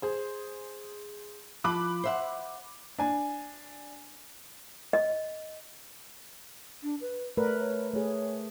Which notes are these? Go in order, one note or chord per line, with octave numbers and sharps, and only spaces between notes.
G#4 C5
F3 B5 D6 F#6
C5 E5 F#5
D4 G#5
D#5
D4
B4
A3 A#4 B4 D5
C#5
A3 G#4 C#5